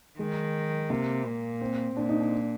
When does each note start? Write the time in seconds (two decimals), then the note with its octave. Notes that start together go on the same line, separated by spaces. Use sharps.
0.19 D#3 G#3
0.90 C3 A#3
1.26 A#2
1.61 C4
1.97 A#2 D4
2.09 D#4
2.21 D4